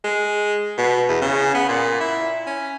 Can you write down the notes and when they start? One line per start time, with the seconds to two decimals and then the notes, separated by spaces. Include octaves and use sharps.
0.04 G#3
0.78 B2
1.09 E2
1.22 C#3
1.54 B3
1.68 A#2
2.00 E4
2.46 C#4